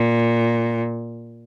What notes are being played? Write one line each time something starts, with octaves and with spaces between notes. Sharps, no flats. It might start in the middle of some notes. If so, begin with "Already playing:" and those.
Already playing: A#2